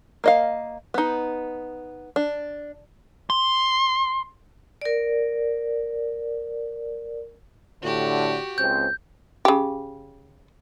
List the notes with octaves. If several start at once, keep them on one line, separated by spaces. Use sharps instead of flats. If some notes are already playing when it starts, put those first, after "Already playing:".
A#3 D#5 F5
B3 D#4
D4
C6
A#4 D5
A2 D3 F#4 G4
C#2 C4 G6
C#3 G4